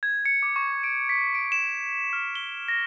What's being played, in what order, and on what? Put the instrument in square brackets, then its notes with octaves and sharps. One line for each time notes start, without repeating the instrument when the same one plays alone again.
[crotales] G#6
C#7
D6
C#6
D7
B6
D7
E7
F6
G7
A#6